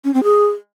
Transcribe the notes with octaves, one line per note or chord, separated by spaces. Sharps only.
C#4
C4
G#4